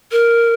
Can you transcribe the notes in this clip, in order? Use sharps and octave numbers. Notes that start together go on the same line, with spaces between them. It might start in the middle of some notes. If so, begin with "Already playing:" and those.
A#4